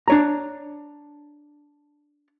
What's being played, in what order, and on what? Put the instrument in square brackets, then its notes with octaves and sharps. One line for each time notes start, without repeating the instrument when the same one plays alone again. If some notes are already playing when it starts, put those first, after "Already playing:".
[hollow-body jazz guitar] D4 C#5 A#5